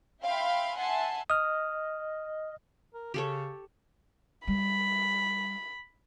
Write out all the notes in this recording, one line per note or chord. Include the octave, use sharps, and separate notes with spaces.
E5 F5 G5 B5 C6
E5 F#5 G#5 A5 C6
D#5 D#6 F6
A#4
C#3 G4 A4 C#5
G3 B5